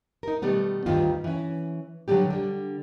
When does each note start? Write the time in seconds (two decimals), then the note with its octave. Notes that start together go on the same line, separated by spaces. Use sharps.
0.23 D#4 A#4
0.42 B2 D#3 G3 A3 B3
0.86 D2 G2 D#3 G3 F4
1.24 E3 C#4
2.08 B2 D3 F#3 G3 A3 G4
2.30 D3 G3